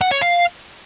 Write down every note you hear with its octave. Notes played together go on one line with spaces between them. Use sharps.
F#5
C#5
F5